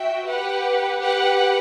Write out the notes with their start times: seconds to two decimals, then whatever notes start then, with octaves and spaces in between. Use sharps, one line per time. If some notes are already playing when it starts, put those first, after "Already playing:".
Already playing: F#4 E5 G5
0.26 G4 B4 F#5
0.99 G4 B4 F#5